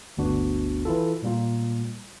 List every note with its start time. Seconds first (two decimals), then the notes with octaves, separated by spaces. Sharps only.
0.17 G1 D2 B3 D4 F#4
0.85 E3 E4 F4 A4
1.23 A#2 G3 A#3 F4